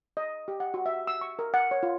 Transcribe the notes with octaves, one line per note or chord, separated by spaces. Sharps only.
D#5
G4
F#5
F#4
E5
E6
C#6
A#4
F#5
C#5
F4